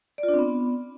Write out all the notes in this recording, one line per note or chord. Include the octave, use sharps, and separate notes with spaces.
D5
F4
D4
C4
B3